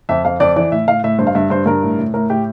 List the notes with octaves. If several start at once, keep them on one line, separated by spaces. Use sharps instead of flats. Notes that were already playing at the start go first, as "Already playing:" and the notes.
F2 E5
F2 F5
F2 D5
E3 D5
A2 E5
A2 F5
A2 E5
G2 C5
F5
G2 E5
G2 C5
G2 A#4
A2
A2
A2 A#4
A2 G4